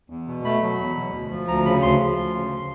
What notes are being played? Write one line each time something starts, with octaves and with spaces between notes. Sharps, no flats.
E2
B2
A3 B5
F#3
E2
B2
D2
F3
D2 A#5
C#3 B5
D2 C6
F3
D2
C#3